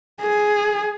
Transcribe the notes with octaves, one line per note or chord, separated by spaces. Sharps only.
G#4